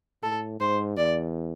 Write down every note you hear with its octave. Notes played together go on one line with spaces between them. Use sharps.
A2 A4
G#2 C5
E2 D5